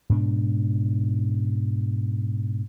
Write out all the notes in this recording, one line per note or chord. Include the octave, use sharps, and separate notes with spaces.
G#2 B2 D4